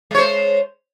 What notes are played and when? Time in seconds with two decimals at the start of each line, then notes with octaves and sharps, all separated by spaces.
0.11 G#3
0.15 C#5
0.18 C5